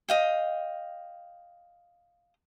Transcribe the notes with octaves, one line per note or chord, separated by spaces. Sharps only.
D#5 F5 G5